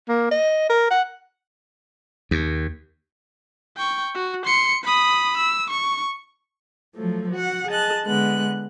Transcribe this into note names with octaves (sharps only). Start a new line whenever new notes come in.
A#3
D#5
A#4
F#5
D#2
G5 C#6
F#4
C6 C#7
B5 D#6
E6
C#6
F3 F#3 A3
F#4 F#5
G#4 D#5 A5 F#6
D3 G#3 B3 F#6